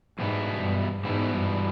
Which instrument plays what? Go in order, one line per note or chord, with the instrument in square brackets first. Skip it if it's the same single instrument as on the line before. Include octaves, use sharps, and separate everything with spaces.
[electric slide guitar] E2 B2 G3 B3 E4 [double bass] G#2
[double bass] G2
[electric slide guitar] E2 B2 G3 B3 E4 [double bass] G#2
[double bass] G2